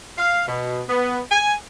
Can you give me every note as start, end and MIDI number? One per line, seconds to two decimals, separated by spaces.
0.18 0.44 77
0.48 0.83 47
0.89 1.19 59
1.32 1.54 80